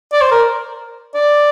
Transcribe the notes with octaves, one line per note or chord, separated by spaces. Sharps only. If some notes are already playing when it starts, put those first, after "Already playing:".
D5
C5
A#4
D5